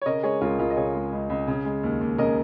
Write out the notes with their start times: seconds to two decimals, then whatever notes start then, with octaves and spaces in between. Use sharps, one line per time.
0.02 C#5
0.06 C#3 A#4 D#5
0.23 G#3 G#4 C#5
0.41 C#2 F4 A#4
0.58 C#2 F4 A#4
0.70 D#5
0.77 C#3 G#4 C#5
0.95 G#3
1.12 C#2
1.30 C#2
1.47 C#3
1.65 G#3
1.83 D#2
2.01 D#2
2.18 C#3 A#4 D#5